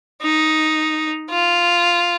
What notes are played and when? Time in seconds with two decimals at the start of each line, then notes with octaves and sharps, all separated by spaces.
0.22 D#4
1.30 F4